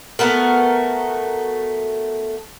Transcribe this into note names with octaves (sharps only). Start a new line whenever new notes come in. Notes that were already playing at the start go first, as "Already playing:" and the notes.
A3 B3 F#4 A#4